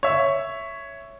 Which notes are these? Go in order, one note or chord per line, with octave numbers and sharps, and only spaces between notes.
C#5 E5